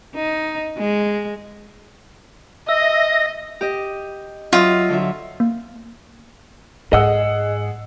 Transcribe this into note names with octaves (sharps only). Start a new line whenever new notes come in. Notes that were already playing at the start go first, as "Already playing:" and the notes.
D#4
G#3
D#5 E5 A#6
G4 D#5
F#3 F4 D#5 E5
D3 F#3 E5
A#3
G#2 G#4 D#5 F#5 E6